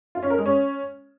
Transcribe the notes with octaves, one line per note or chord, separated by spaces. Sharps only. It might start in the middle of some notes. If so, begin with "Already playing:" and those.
F4
C#4
A#4
G#3
C#4